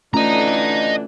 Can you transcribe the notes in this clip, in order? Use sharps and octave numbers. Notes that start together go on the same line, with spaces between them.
D3 E3 A3 C#4 D4 F4 D#5 A#5